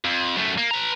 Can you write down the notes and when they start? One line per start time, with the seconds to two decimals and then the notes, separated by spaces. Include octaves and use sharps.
0.05 F2
0.37 F#2 A3
0.58 A#3
0.71 B4 A#5